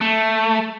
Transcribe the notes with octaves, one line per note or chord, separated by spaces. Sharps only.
A3